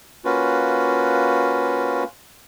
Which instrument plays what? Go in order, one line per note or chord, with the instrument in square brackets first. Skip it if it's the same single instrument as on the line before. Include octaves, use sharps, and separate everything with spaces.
[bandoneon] A#3 C#4 F4 F#4 B4